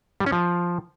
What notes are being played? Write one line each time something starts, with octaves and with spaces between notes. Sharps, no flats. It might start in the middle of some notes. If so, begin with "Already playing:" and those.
G3
C#4
F3